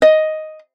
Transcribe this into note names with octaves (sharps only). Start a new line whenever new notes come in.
D#5